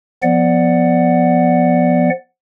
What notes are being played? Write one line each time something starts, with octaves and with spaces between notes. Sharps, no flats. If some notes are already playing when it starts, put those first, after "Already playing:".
F3 B3 D5 F#5